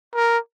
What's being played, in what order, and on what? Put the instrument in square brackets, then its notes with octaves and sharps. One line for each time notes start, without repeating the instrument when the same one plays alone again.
[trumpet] A#4